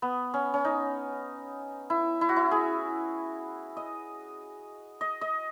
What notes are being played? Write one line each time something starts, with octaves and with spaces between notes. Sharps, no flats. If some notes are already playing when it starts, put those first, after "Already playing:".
B3
C#4
C#4
D#4
E4
E4
F#4
E4
G#4
D#5
D#5
D#5